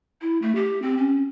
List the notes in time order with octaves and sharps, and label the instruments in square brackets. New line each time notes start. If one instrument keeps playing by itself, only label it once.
[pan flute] E4
A3
G4
C4
C#4